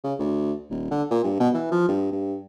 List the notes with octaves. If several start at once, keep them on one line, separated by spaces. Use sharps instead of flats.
C#3
D2
D#1
D3
A#2
G2
B2
E3
F3
G2
G2